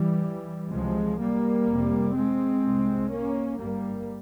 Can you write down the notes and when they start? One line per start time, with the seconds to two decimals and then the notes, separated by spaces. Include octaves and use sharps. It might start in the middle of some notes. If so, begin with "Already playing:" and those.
Already playing: E3 G3
0.70 C#2 C3 F3 G#3
1.18 G3 A#3
1.66 F1 F2 C3
2.14 G#3 C4
2.62 C2 C3
3.10 A#3 C#4
3.57 G1 G2 G3 A#3